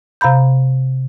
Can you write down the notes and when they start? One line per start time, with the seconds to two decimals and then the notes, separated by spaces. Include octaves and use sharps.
0.21 C3 F5 A#5 B5 G6